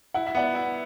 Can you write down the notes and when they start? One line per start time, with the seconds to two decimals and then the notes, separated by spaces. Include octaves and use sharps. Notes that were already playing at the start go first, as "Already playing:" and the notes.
0.14 E4 F#5
0.27 E5
0.35 B3 D5 F#5
0.55 E4